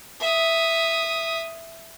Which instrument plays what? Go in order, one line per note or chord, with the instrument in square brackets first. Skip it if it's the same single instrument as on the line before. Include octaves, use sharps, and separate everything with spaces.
[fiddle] E5 D#6